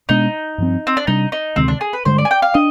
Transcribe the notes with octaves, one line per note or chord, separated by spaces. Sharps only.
B2 G#3 B3 D4 D#4
G2 F3 C4
C4
D4
C3 G3 D4 D#4
D#4
D2 C3 D#3 G#3 C4
D4
G#4
B4
G2 D3 G#3 C5
D5
G#5
G5
F5
D4 D#5